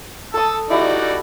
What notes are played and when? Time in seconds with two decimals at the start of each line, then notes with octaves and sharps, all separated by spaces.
0.34 A4 A5 D#6 E6
0.70 G3 D#4 E4 F#4 D5